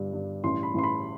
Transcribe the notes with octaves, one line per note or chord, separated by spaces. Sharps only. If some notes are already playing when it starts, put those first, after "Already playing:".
Already playing: G1 G2 G3
G2
A1 C6
B5
A1 C6
B5